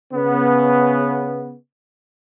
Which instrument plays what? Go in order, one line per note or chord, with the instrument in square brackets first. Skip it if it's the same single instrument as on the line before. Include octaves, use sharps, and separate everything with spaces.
[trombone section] C#3 B3